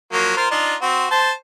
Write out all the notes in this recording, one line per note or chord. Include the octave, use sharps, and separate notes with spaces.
F3 F#3 A#3
F4 A#4 C5
D4 D#4 F4
C4 F#4
C5 A5